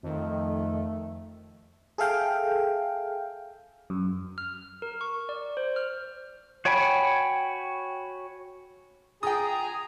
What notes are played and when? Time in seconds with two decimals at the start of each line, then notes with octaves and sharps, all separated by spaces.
0.03 F2 D#3 A3
1.98 G#4 A4 E5 F5 G5
3.90 F#2
4.38 F6
4.82 A#4
5.01 C#6
5.29 D5
5.57 C5
5.76 F6
6.65 F#4 C#5 G5 G#5 B5
9.23 F4 G#4 G5 G#5 A#5 D#6